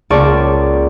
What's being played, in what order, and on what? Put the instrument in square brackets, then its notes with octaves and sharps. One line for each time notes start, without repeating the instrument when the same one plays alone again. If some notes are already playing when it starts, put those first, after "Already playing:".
[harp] C#2 A#3 D5 A5 C#6 D7